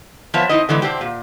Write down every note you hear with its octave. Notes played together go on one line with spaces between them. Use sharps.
F3 B3 C#5 E5 A5
C4 D#4 E4 D#5
D3 E3 G#3 B3
C3 C4 D4 G4
A#2